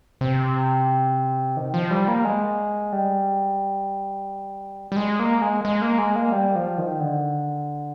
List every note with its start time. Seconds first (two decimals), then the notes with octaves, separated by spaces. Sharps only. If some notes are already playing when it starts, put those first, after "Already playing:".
0.21 C3
1.57 D#3
1.74 F3
1.91 G3
2.08 A#3
2.25 G#3
2.92 G3
4.92 G3
4.96 G#3
5.19 A#3
5.42 G#3
5.65 G#3
5.82 A#3
5.98 G#3
6.16 A#3
6.32 G3
6.55 F3
6.78 D#3
7.00 D3